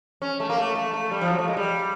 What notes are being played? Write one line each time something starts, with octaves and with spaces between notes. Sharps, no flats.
C#4
A3
A#3
A3
A3
A3
G3
F3
F#3
A3
G#3
G3